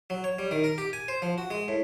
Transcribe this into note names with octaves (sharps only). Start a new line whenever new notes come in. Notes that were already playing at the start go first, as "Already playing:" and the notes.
F#3
C#5
G3
D#3
A#4
G4
G#5
C5
F3
F#4
G#3
A2